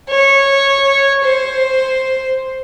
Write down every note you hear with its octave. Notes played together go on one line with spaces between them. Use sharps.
C#5
C5